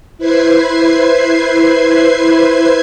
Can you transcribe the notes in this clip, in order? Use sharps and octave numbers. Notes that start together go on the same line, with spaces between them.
E4 B4 C5 G#6 C7